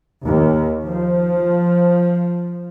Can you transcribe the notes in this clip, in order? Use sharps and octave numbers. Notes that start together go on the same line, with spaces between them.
D#2
F3